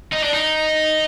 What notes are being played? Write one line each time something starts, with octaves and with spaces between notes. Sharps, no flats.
D#4
D4
D#4